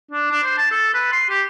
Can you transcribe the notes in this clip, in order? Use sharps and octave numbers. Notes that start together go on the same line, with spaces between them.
D4
D4
C5
A5
A4
B4
C6
G4